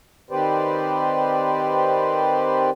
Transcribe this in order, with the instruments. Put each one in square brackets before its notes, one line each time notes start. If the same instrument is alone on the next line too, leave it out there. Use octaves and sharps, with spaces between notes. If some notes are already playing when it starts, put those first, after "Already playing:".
[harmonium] D#3 C4 G4 B4 C5 D5